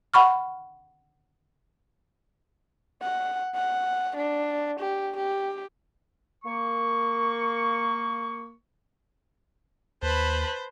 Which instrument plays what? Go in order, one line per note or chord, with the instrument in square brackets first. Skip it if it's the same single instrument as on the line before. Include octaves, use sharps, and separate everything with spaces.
[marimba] F#5 B5 C#6 F6
[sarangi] F#5
F#5
D4
G4
G4
[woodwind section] A#3 C#6
[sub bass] D#2 [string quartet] B4 A5 B5 [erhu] C5